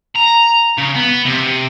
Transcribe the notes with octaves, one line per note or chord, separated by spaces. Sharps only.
A#5
C#3
B3
C3